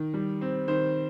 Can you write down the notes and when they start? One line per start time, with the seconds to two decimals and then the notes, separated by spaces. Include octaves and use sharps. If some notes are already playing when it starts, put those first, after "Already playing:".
Already playing: D#3
0.14 G3
0.41 C4
0.68 D#3 C5